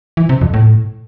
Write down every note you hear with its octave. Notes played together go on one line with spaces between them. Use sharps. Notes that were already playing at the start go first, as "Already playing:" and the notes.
E3
C3
F2
A2